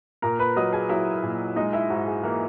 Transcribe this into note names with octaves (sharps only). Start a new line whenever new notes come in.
A#2 A#4 A#5
B4 B5
F#3 D#5 D#6
G#4 G#5
F#3 E4 E5
A#2
G#3 D#4 D#5
E4 E5
G#2 F#4
G#4
E3 A#3 A#4